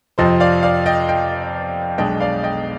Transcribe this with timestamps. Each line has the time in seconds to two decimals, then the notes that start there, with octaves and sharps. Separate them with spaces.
0.18 F2 C3 F3 C5 D#5
0.40 D5 F5
0.63 D5 F5
0.86 D#5 G5
1.08 D#5 G5
1.98 B1 B2 G#3 D4 D#5 G5
2.20 D5 F5
2.43 D#5 G5